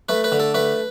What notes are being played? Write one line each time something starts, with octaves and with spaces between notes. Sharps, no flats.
A3 B4
B4
D3
A4
A3 B4